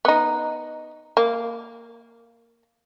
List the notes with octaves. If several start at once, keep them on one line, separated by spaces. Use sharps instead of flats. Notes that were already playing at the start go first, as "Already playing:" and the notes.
B3 D#4
A#3